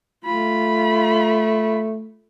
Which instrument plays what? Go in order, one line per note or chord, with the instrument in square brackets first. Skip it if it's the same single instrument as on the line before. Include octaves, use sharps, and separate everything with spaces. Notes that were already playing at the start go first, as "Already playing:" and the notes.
[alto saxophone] A3 [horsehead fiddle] F4 B5